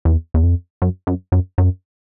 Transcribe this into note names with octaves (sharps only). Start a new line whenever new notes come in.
E2
E2
F2
F#2
F#2
F#2
F#2